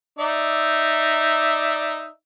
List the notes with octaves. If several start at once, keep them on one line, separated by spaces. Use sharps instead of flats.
D#4 D5 E5